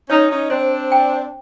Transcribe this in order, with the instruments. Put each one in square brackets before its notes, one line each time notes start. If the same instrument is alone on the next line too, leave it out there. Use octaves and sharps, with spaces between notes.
[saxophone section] C#4 D#4 [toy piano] C#5
[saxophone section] C#4 D#4
[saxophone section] C4 D4 [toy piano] C5
[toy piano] G5